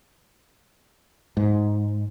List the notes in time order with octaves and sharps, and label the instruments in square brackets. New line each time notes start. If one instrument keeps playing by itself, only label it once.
[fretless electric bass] G#2